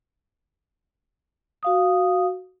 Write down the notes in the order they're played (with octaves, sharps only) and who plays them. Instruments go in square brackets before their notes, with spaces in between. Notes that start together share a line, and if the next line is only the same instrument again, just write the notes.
[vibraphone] F#4 F5 D#6